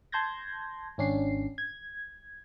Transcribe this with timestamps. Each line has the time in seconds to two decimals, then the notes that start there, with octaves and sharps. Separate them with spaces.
0.12 A5 C6 G6 G#6 A#6
0.98 G#1 C#4 D4 C7
1.58 G#6